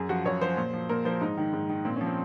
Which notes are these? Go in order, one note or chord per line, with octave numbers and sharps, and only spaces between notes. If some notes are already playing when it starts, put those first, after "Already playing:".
Already playing: F#2 G#4
F3 F#4
F#2 C#5
F3 C5
A#2
F3
A#2 A#4
F3 C5
G#2 D#4
D#3
G#2
D#3
A#2 C4
C#4
F3
C4